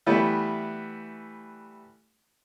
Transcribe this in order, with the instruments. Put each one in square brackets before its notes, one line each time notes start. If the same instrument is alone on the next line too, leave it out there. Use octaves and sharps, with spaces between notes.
[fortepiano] E3 G3 A3 B3